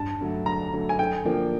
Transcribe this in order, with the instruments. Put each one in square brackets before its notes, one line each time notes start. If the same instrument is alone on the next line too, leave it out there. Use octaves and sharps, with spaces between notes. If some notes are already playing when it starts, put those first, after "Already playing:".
Already playing: [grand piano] G2 [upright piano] A5
[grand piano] D3 F#3 A3
[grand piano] G2 [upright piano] A#5
[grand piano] D3 F#3 A3
[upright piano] G#5
[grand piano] D3 [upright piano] G5
[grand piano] F3 A#3 D4